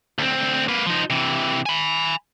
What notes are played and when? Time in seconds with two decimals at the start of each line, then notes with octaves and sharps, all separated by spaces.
0.19 D2 C4
0.68 A#3 B4
0.86 F3 D#4
1.10 C3 E3
1.66 G#5 B5